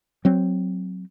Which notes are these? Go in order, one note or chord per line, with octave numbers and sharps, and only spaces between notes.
F#3 C4